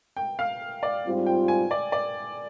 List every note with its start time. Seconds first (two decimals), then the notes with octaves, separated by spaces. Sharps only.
0.17 G5
0.39 F5
0.83 D5
1.05 G#2 G3 C4 F4
1.26 G5
1.48 G#5
1.71 D5
1.92 D5